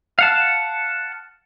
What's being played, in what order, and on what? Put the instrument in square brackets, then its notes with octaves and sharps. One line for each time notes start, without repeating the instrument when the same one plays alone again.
[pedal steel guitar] F5 F#5 A5